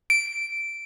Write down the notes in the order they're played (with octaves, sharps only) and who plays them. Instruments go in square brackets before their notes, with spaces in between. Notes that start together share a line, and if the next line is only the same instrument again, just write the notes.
[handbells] D7